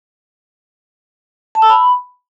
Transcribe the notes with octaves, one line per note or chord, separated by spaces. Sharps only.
A5
E6
B5